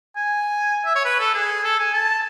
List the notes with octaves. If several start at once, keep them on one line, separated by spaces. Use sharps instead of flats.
G#5
E5
C#5
B4
A4
G#4
A4
G#5
A5